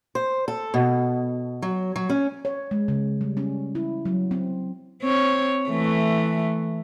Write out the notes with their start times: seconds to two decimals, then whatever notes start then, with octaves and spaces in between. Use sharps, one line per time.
0.15 C5
0.48 A4
0.74 B2
1.62 F#3
1.96 F#3
2.10 C#4
2.45 C#5
2.71 G#3
2.88 C#3
3.21 G3
3.37 C#4
3.75 E4
4.05 F#3
4.31 C4
5.02 C4 C#5
5.70 E3 A3